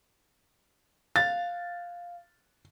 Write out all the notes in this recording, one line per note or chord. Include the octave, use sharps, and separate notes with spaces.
F5 A6